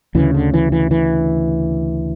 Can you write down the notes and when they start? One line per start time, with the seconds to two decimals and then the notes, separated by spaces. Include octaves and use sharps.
0.15 D2 C#3 E3
0.35 D3
0.54 E3
0.72 E3
0.91 E3